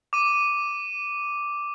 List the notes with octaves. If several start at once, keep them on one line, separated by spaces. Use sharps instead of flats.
D6 D#7